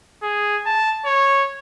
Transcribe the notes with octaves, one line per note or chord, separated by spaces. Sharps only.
G#4
A5
C#5